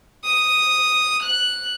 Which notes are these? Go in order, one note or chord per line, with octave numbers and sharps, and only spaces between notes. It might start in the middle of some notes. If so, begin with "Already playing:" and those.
D#6
F#6